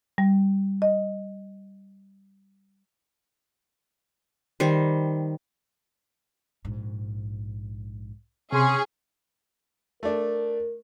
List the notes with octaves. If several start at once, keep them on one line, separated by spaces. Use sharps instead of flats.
G3
D#5
D#3 G3 C5
A#1 G#2
C3 C#4 G#4 C6
A3 D4 A#4